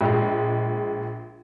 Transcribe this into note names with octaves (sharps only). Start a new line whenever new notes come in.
A#1 G#3